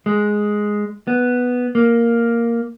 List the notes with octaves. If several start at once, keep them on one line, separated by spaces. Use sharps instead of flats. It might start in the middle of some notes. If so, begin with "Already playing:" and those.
G#3
B3
A#3